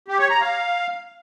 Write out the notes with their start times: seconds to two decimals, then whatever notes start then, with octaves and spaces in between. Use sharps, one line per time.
0.08 G4
0.19 C#5
0.30 A#5
0.41 F5